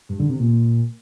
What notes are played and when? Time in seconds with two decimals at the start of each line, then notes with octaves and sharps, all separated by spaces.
0.09 G2
0.19 D3
0.29 C3
0.39 A#2